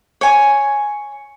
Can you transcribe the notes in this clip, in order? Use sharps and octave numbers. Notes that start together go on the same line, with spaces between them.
C#5 G#5